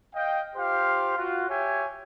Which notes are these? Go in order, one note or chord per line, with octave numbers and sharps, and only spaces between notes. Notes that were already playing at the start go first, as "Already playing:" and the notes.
D#5 F5 G5
F4 G4 C5 F5
F4 F#4
G4 C#5 E5 G#5